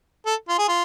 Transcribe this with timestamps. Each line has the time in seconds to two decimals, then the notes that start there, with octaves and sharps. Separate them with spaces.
0.26 A4
0.49 F4
0.59 G#4
0.68 F4